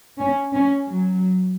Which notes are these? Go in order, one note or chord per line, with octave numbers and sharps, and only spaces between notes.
C#4
C#4
F#3